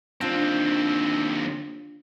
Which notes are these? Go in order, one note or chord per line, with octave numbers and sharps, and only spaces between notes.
D#2 C4 D4 F4